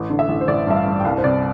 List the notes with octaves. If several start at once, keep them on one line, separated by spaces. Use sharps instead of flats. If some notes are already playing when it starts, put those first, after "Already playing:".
Already playing: A1
D3
E5
A1
C5
A1 D5
G2 E5
F5
G2
G5
C2 F5
C5
C3 D5